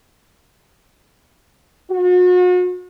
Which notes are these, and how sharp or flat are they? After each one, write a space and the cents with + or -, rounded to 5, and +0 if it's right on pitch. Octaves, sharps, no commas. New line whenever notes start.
F#4 -40